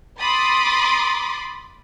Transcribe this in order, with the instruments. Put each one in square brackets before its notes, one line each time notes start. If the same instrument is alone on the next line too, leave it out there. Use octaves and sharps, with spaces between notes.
[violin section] B5 C6 D6 D#6 A6